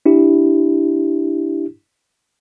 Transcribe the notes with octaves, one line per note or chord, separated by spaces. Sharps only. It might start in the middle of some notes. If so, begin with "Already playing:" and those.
D4 E4 G4